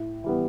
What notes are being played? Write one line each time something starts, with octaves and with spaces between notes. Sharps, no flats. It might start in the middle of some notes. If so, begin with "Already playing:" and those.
Already playing: A2
E3 G3 B3